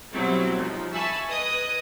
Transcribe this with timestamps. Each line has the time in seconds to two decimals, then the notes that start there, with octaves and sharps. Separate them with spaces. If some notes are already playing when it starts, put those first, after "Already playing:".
0.13 B2 F#3 G3 C4 E4
0.57 F3 D#4
0.93 E5 G#5 A5 B5 C#6 E6
1.28 B4 D#5 D#6 F#6 G#6